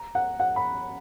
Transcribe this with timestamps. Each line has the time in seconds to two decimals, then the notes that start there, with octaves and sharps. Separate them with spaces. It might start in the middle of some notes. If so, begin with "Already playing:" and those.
Already playing: A#5
0.15 F#5
0.40 F#5
0.56 B5